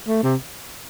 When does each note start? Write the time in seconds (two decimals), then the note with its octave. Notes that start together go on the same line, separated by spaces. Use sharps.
0.08 A3
0.23 C3